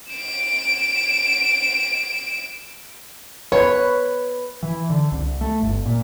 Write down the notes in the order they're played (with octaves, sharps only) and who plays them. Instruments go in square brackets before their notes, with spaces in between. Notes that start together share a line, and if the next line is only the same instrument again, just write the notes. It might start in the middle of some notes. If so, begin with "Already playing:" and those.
[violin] D7 E7
[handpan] B4 [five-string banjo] C#5
[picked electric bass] E3
D3
C2
A3
G1
A#2